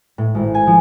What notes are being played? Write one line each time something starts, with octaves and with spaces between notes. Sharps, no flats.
A2
G#1
G#5
F3